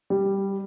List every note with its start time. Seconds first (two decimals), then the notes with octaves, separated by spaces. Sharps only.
0.10 G3